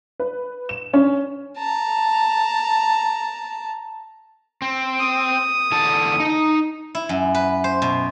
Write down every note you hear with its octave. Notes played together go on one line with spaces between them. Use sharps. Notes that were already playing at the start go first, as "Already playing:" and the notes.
B4
E7
C#4
A5 A#5
C4
D#6
E2 D3 A5
D#4
E4
F#2
B4
C5
B2